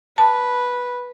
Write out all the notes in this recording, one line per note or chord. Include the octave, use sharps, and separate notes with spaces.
B4 A5